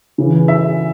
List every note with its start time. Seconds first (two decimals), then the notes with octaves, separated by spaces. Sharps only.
0.18 C#3 E3
0.48 E5